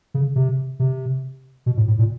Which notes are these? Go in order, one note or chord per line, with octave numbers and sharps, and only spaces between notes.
C#3
C3
C3
B2
A2
A2
A#2